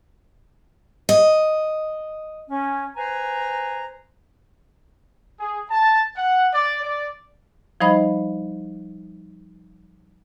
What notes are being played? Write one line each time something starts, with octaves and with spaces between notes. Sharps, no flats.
D#5
C#4
B4 C5 G#5 A#5
G#4
A5
F#5
D5
D5
F3 G3 D#4 C5 D#5 B5